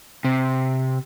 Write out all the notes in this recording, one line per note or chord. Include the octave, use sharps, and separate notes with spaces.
C3